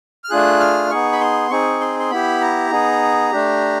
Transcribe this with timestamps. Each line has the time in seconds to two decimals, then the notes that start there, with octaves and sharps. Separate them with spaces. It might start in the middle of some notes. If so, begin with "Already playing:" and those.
0.24 F6
0.30 A3 D4 F4 G#4 F#6
0.60 F6
0.90 B3 D#4 G#4 C#6
1.12 B5
1.21 C6
1.50 C4 D#4 G#4 C#6
1.81 C6
2.00 C6
2.10 B3 E4 G4 B5
2.41 A#5
2.71 B3 D#4 G#4
3.31 A3 D4 G4